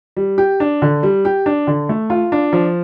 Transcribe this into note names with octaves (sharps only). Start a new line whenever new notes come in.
G3
G4
D4
D3
G3
G4
D4
D3
A3
F4
D4
F3